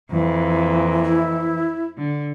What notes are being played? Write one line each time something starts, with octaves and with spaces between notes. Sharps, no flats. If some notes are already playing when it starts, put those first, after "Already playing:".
F2 E3 A#3
E4
D3